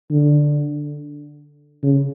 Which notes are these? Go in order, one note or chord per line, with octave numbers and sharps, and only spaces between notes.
D3
C#3